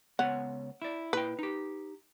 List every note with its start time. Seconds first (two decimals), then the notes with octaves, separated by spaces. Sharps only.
0.19 C#2 B3 C#5 F#5
0.82 E4 D5
1.13 A#2 E4 B4 G5
1.39 D#4 G4